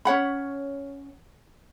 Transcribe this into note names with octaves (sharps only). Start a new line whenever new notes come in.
C#4 C#5 F#5 B5